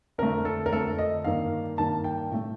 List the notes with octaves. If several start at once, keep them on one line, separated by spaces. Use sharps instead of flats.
F2 D3 A3 A#4
A4
A#4
F2 D3 A3 A4
D#5
G2 D#3 A#3 F5
G2 D#3 A#3 A5
G5
A2 A3